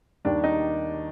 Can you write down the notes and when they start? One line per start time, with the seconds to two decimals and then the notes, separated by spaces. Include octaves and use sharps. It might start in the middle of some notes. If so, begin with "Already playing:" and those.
0.25 D#2 D#3 G3 D4
0.44 D#4